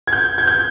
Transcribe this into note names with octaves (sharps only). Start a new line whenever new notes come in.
G#6
G6
G#6
G6